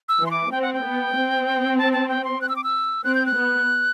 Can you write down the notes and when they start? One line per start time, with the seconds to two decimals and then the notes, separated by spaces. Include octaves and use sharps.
0.09 E6
0.20 E3
0.26 C6
0.31 D6
0.51 C4 G5
0.62 F#5
0.74 G5
0.83 B3
1.15 C4
1.78 A5
1.93 A5
2.09 G5
2.24 C6
2.41 F#6
2.49 E6
2.56 D6
2.64 E6
3.04 C4 F#6
3.15 G6
3.26 F#6
3.35 B3